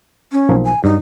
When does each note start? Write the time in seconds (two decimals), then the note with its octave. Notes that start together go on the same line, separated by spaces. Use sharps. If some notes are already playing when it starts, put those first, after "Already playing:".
0.32 C#4
0.49 B1 F3 A#3
0.65 G#5
0.84 G2 F#3 D#4